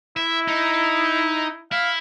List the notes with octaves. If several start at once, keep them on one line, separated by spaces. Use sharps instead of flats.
E4 E5
D#4
E4 F5